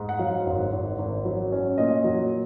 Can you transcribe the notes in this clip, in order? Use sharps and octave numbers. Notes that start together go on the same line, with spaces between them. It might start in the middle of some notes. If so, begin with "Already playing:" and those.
Already playing: G#2
F#5
F#3 F5
G#1
G#1
G#1
F#3
C#4
A#2 D#5
F#3